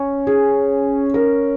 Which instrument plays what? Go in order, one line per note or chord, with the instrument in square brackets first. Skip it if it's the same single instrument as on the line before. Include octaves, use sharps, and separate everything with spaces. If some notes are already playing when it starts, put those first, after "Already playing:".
Already playing: [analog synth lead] C#4
[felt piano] G#4
A#4